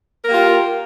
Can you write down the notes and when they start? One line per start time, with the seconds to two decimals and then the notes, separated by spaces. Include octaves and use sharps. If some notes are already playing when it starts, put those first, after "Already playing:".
0.24 A#4
0.27 A#3
0.29 G4
0.32 F4